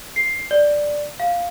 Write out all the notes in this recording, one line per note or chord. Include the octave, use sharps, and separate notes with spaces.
C7
D5
F5